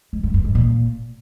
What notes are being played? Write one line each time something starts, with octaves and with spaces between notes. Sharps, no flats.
G#2
G2
G2
G#2
A#2